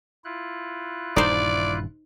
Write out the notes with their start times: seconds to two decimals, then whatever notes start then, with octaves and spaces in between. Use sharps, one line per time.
0.24 E4 F4 F#6
1.16 D#1 G2 E3 D#4 C5 D5